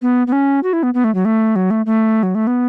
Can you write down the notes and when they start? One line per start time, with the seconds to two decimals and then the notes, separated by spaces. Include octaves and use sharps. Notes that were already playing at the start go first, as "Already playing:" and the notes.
0.02 B3
0.27 B3
0.32 C#4
0.63 F#4
0.73 E4
0.83 B3
0.94 B3
1.04 A3
1.15 F#3
1.25 A3
1.56 F#3
1.71 A3
1.86 A3
2.23 F#3
2.35 A3
2.47 B3